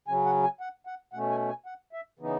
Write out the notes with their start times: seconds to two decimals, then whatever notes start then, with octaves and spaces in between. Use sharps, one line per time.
0.08 C#3 F#3 C#4 G#5
0.26 F#5
0.43 G#5
0.61 F#5
0.87 F#5
1.13 B2 A3 C#4 F#5
1.31 G#5
1.49 G#5
1.66 F#5
1.93 E5
2.19 C#3 E3 B3 D#4